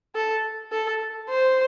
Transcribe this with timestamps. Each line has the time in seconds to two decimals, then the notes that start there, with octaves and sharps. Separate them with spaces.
0.15 A4
0.72 A4
1.29 C5